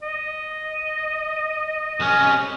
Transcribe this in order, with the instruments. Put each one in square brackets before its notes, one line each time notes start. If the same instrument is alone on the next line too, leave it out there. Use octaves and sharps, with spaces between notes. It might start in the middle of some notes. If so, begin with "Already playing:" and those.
[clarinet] D#5
[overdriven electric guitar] C2 C#4